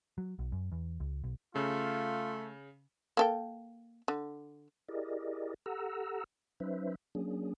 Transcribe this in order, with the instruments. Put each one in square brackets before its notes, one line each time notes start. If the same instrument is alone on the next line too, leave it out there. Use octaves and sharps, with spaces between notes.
[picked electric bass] F#3
B1
F#2
E2
C#2
B1
[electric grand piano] C#3 [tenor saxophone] A3 [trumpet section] F4
[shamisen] A#3 A4 G5
D3
[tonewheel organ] E4 G4 G#4 A#4 D5 D#5
G4 A4 F#5 A#5 E6
F#3 C#4 D#4 B4 C5 E5
F#3 A#3 C#4 D4 G#4